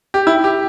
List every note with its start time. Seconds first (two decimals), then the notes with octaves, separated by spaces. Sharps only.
0.14 G4
0.27 E4
0.44 G4